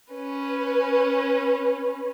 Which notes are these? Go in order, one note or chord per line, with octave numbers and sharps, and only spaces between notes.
C#4 B4